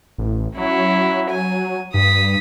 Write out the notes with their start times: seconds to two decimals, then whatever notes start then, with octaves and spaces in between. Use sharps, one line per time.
0.18 A1
0.57 F#3 C#4 E4
0.94 F#3
1.31 G#5
1.94 G2 D#6 B6